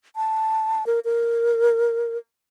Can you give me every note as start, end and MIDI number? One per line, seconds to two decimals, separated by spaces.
0.16 0.86 81
0.86 0.99 70
1.05 2.17 70